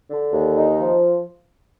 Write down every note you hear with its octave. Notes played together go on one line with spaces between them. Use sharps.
D3
D#2
D#4
F3